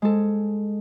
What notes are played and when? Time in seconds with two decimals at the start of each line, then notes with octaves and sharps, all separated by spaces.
0.02 G#3 A4